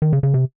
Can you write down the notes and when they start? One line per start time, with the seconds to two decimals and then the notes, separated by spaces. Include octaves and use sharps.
0.02 D#3
0.13 C#3
0.23 C#3
0.34 C3